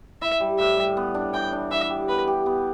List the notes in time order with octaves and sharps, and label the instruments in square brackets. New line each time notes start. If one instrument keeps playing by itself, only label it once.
[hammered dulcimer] E4 [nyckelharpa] E5
[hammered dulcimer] G3
[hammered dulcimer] A2 [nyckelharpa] E5
[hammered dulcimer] G3
B3
D4
[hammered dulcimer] E3 [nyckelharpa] G5
[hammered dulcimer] D4
[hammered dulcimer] E3 [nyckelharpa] E5
[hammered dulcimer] G4
[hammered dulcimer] B3 [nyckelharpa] B4
[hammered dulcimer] G4
B3